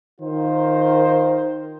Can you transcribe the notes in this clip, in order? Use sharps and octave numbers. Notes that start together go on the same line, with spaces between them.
D#3 F4 A#4 C5